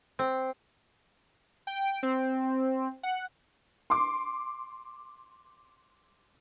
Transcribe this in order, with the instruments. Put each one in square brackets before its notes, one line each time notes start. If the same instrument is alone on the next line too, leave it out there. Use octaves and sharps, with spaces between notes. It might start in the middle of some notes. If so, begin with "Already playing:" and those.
[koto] C4
[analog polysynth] G5
C4
F#5
[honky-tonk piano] C6 D6